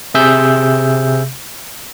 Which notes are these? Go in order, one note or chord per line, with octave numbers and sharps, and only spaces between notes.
C3 G#4 E5 E6 G6